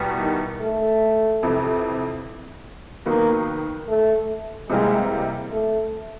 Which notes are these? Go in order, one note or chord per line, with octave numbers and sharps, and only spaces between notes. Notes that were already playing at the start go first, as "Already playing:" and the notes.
Already playing: E2 B2 G3 B3
D#3
A3
F2 C3 E3
D#3 F#3 A#3 B3 D#4
A3
C3 E3 G3 G#3 A#3
A3